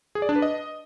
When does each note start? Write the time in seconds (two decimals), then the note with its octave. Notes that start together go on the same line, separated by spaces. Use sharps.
0.15 G#4
0.22 D5
0.29 D4
0.36 B4
0.42 D#5